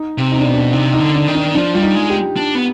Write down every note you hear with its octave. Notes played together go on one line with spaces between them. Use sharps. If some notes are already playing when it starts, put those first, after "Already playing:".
Already playing: D#4
C3
D#4
D4
B2 C4
D4
C3 D#4
D#4
D3
D4
D#3
D4
F3 D4
G3 F4
D#4
G#3
G4
D4
B3